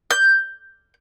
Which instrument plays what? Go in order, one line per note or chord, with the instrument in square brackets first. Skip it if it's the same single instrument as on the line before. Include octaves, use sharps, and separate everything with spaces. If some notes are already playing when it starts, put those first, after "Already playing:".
[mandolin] G6